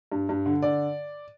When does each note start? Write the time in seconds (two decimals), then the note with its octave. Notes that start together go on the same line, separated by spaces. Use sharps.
0.12 G2
0.29 G2
0.46 D3
0.63 D3 D5